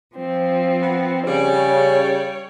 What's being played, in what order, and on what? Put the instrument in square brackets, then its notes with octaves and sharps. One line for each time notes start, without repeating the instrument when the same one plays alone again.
[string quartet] F3 C4
[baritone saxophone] B3
[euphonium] C#3 [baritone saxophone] G3 [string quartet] C#5